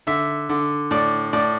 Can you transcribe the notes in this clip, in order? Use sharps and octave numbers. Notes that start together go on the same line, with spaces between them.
D3 E5
D3
A2 D5
A2 D5